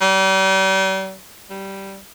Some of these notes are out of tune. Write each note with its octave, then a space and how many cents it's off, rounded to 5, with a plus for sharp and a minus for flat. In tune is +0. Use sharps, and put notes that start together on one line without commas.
G3 -40
G3 -10